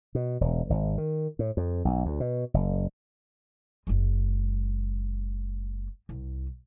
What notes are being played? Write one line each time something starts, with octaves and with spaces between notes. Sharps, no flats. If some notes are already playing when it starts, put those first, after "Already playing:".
B2
E1
G#1
D#3
A2
F2
B1
D2
B2
F#1
F#1 G#3
C2